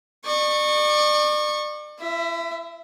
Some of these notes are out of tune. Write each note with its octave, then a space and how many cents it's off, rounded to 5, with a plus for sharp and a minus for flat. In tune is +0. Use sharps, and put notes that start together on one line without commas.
D5 +35 C#6 -20
E4 +40 E5 +0